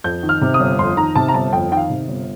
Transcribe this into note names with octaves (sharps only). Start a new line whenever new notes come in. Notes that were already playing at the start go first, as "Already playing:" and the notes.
F2 G6
D#3
F6
C3
D#6
G1
F2 C6
D#3 A#5
C3 A5
A#5
G1 A5
F2 G5
D#3 G5
F5
C3
G1